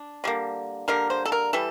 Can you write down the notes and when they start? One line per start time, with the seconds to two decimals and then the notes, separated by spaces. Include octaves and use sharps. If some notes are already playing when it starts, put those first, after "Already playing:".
Already playing: D4
0.24 D3 G3 A#3
0.88 D3 G3 A#3 A#4
1.10 C5
1.25 A4
1.32 A#4
1.53 E3 G3 A4